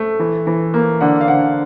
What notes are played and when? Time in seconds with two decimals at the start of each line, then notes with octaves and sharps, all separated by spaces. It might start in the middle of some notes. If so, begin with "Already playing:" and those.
Already playing: A3
0.20 E3
0.47 E3
0.74 A#3
1.01 D3 F#5
1.21 F5
1.28 D3 F#5